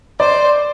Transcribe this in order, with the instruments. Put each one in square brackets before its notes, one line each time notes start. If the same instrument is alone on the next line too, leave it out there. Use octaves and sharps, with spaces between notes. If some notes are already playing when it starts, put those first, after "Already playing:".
[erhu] C5 [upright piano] D5